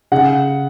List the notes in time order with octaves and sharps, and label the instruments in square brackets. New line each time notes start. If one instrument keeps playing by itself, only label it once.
[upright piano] C#3 F#5